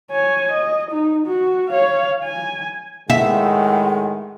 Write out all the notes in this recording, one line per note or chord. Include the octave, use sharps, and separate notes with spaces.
C#5 G#5
D#5
D#4
F#4
C#5 F5
G#5
A2 D#3 G#3 E5 F#5